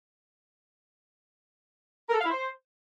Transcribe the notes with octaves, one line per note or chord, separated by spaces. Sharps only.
A#4
A4
F5
E4
C5